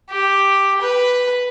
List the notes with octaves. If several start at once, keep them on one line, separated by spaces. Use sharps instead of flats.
G4
B4